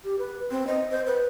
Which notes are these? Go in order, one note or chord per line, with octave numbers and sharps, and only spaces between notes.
G4
B4
C4
D#5
C5
B4